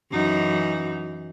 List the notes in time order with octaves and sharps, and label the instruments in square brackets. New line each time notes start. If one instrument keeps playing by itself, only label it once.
[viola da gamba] F#2 E3 D#4